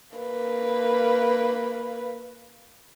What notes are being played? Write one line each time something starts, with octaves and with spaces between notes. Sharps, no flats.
A#3 B4